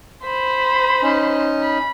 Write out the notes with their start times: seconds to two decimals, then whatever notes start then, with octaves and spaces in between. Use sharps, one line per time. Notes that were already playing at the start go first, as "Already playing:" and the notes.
0.24 C5 B5
1.02 C#4 D#4
1.62 B5